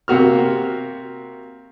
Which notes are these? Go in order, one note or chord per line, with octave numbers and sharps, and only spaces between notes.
C3 A#3 F#4 F6